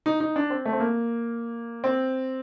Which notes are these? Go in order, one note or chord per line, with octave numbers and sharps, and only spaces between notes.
D#4
D#4
D4
C4
A3
C4
A#3
C4